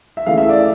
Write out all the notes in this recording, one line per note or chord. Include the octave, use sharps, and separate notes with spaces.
E5
C#3 E3 A3 F5
E5
D5